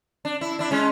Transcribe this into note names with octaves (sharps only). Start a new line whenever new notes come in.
D4
E4
D4 E4
G#3 C#4